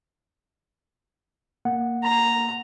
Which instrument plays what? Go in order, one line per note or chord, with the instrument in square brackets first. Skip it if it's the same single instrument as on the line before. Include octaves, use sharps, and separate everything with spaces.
[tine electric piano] A#3 F#5
[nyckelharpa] A#5